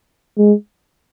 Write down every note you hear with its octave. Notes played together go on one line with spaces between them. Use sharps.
G#3